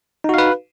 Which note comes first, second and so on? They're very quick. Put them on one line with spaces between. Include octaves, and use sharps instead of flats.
D#4 F#4 F5 B4